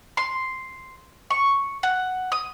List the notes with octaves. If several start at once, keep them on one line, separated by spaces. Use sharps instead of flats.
C6
C#6
F#5
D#6